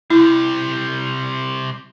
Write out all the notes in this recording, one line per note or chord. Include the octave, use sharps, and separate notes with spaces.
C3 G3 E4